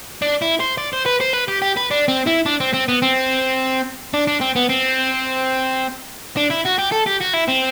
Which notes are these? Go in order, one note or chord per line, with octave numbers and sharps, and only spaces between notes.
D4
E4
C5
D5
C5
B4
C5
B4
G4
G4
B4
D4
C4
E4
D4
C4
C4
B3
C4
D4
D4
C4
B3
C4
D4
E4
F#4
G4
A4
G4
F#4
E4
C4